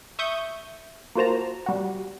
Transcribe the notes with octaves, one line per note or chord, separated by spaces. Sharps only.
E5 C#6 D#6 G6
A#3 F4 F#4 C5 A5 A#5
G3 F#4